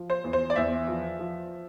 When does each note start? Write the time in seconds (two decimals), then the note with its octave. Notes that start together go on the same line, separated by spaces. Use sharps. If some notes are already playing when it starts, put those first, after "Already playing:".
Already playing: F3
0.10 C5
0.24 E2
0.33 C5
0.50 D5
0.56 E2 E5
0.88 F3
1.19 F3